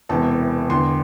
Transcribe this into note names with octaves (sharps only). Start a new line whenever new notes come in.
E1 E2 C3 E3 A5
E1 E2 D3 C6